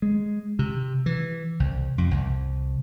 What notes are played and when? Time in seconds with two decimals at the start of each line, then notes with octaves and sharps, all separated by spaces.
0.02 G#3
0.59 C3
1.06 E3
1.60 C2
1.98 F2
2.11 C2